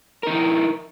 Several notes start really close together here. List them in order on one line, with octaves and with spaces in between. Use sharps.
A#4 D#4 E4